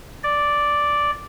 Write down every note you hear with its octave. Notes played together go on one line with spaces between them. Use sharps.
D5